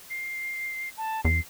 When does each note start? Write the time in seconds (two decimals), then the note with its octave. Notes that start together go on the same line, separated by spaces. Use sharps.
0.10 C7
0.98 A5
1.25 E2 C7